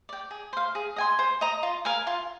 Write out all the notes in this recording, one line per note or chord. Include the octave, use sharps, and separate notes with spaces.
D5 G5
G#4
C5 F5
G#4
D#5 G#5 C6
C5
D#5 A#5 D#6
F4
A#4 F5 G#5
F4